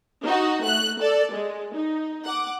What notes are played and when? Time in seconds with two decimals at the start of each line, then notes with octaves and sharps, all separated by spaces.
0.24 D#4 F#4
0.62 A3 F#6
1.00 A4 D5
1.33 G#3
1.74 D#4
2.24 F#5 D6